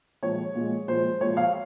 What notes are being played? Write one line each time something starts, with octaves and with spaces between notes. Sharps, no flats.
A#2 F3 G#3 C#5
A#2 F3 G#3
A#2 F3 G#3 C5
A#2 F3 G#3 C#5
F5